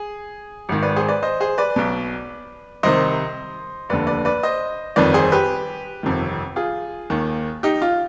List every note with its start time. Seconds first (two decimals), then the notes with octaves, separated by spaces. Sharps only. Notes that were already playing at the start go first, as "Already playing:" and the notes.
Already playing: G#4
0.69 G#1 G#2 D#3
0.82 B4 D5
0.96 G#4 C5
1.09 B4 D5
1.23 C5 D#5
1.40 G#4 C5
1.58 B4 D5
1.76 B1 B2
2.83 C2 C3 D#3 C5 D#5
3.89 F1 D#2 D3 B4 D5
4.07 B4 D5
4.25 B4 D5
4.43 C5 D#5
4.96 G1 F2 D#3 B4 D5
5.14 G#4 C5
5.32 G4 B4
6.03 G1 F2 C3 D#3
6.56 F4 G#4
7.10 D#2 D#3
7.63 D#4 G4
7.82 F4